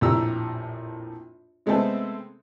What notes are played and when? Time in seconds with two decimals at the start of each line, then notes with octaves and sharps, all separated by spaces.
0.01 A#1 F2 A2 G4 A#5 E6
1.66 C3 G#3 A3 B3 C4 A4